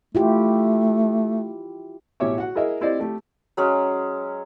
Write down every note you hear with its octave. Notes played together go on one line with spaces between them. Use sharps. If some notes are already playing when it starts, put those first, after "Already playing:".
A3 E4 F4 G4
A1 B2 G4 C#5 E5 D6
F#4 F#5
E4 G#4 A#4 D#5 E5
C4 E4 G4 C5 D5 D#5
A3 G4 A4
F#3 G#3 C#4